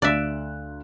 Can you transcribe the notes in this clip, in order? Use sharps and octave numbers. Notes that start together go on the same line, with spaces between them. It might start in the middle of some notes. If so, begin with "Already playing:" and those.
D2 D5 E5 F5 F#6